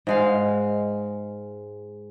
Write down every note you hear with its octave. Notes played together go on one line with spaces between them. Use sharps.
G#2 G#3 F5